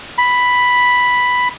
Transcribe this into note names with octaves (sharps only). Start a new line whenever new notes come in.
B5